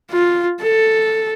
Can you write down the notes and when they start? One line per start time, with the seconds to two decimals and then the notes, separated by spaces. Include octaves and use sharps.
0.11 F4
0.62 A4